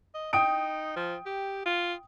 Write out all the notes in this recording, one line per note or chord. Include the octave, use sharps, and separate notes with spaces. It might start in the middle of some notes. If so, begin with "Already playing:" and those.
D#5
D#4 G5 D#6 D7
F3
G4
F4